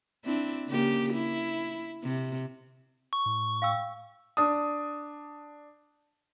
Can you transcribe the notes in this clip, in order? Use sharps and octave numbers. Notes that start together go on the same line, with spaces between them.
C4 D4 E4
C#3 A#3 G4
E4
C3
C#6
A2
F5 G5 E6
D4 D#6